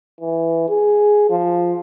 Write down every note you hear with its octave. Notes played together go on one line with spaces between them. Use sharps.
E3
G#4
F3